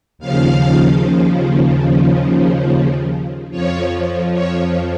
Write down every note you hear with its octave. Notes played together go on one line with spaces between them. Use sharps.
D#2 C#3 F3 F5
F2 F3 C#5
C#5